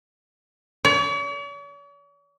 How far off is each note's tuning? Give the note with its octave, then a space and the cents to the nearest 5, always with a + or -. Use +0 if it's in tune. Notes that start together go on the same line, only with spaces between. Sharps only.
C#5 +45